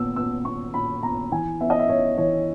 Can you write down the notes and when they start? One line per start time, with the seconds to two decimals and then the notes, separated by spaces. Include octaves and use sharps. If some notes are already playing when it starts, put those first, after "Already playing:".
Already playing: A#2 B3 E6
0.16 B3 E6
0.45 B3 C#6
0.74 A#2 B5
1.03 B3 A#5
1.31 E3 G#5
1.61 B3 E5
1.70 D#5
1.79 E5
1.89 B3 C#5
2.18 E3 C#5